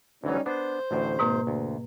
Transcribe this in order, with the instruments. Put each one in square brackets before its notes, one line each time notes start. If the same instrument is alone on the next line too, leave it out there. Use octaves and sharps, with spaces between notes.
[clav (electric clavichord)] D2 E3 F#3 [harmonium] G3 C#4 D#4
[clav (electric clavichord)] B3 D4 [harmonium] C5
[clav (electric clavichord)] A1 D2 A2
[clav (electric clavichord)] G#1 [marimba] G#2 B2 A#3
[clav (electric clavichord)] D2